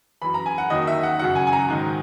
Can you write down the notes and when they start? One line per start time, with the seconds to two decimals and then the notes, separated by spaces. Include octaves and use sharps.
0.22 F#2 E3 B5
0.34 A#5
0.46 G#5
0.58 F#5
0.70 D#2 D#3 F#3 D#5
0.87 E5
1.03 F#5
1.19 F#2 C#3 F#3 F#5
1.35 G#5
1.47 G#5
1.53 A#5
1.68 G#2 D#3 F#3